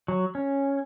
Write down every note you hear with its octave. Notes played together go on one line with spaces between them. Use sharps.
F#3
C#4